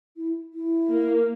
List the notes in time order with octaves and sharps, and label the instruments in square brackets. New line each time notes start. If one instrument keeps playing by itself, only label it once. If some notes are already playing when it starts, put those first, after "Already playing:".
[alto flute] E4
E4
[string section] A#3